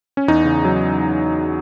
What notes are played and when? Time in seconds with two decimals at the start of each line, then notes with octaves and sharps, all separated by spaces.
0.17 C#4
0.28 E2 D#4
0.45 C#3
0.65 F#3